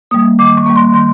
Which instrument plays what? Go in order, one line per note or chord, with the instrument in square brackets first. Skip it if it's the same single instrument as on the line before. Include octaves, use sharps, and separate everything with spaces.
[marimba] G3 A#3 D#6
D#3 D6
C#6
G3 A#3
C6
D#3 C6